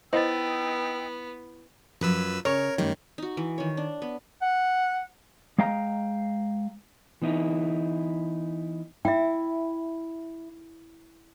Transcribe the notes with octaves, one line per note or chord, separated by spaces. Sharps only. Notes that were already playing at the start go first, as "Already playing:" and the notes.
B3 D#4 E4 C5 D#5 G5 E6 A6
F#2 F3 F#3 B4 E6
C#3 A#4 C#5
F#2 D#3 G3 A3
D#4 F#4
E3
D#3 C#5
D4
B3
F#5
G#3 D#5 F5 G5 A#5
E3 B3 D#4 E4
E4 E5 G5